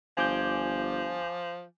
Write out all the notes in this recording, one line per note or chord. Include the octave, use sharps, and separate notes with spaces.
G1 F3 G#5 D6 G6